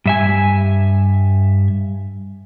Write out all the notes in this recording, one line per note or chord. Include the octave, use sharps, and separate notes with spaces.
G2 E5 G#5